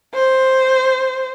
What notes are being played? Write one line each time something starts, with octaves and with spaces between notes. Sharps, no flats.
C5